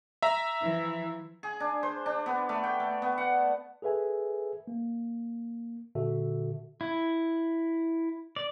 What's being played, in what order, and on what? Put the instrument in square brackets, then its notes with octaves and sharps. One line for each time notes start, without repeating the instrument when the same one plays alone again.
[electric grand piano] E5 A#5
[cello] E3 F3
[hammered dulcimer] G#4
D4
C5
D4
B3
A3
G5
A3
B3
F#5
[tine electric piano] G#4 A4 B4 E5 G#5
A#3
A#2 D3 F#4 A4 E5
[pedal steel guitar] E4
D5